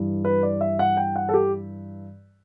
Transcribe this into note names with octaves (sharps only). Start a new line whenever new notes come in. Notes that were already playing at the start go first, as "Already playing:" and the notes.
Already playing: G2 E3
B4
D5
E5
F#5
G5
F#5
A4
G4